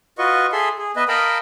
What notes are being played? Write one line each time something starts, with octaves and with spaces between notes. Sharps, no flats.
F4 F#4 B4 D#5 C#6
G#4 A4 E5 C6
G#4
B3 B4 D#5 E5
A#4 D#5 F5 G5 A5 B5